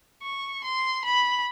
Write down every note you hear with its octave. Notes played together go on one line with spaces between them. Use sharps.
C#6
C6
B5